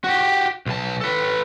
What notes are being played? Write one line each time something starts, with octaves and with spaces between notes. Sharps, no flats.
F#4 G4
B1 A5
A4 B4